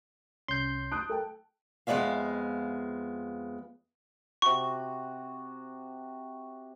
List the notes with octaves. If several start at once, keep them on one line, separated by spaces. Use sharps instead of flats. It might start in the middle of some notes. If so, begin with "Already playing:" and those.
C2 C#4 C6 G6
A5 D#6 F#6 D7
A4 G5
F2 G#3 B3 D5 E5 F5
C3 F#4 C#6